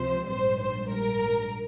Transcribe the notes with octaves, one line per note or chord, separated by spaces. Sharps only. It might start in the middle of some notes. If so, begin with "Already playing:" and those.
Already playing: C#2 C3 F3 C4 C5
A#1 G#2 G3 C5
C5
A#4